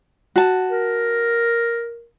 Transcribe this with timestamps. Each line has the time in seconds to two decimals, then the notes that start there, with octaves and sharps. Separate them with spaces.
0.36 F#4 A5
0.70 A#4